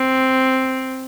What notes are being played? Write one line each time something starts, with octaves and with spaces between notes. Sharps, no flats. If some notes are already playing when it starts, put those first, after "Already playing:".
Already playing: C4